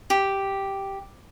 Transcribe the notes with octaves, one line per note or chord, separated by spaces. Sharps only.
G4